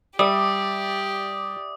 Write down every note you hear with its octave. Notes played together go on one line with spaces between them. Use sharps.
G3 G4 D5 E5 D#6